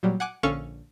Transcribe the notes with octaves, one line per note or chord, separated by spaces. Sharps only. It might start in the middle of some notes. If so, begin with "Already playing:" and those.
A#2 F#3 G3
F#5 G#5 D6 F#6
A#1 D3 C#4 A4 F5 C#6